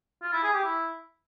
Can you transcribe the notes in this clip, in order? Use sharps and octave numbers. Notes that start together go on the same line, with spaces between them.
F4
E4
G#4
G4
E4